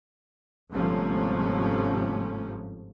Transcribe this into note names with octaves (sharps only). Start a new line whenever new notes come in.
G1 G#2 C3 F3 A3 C#4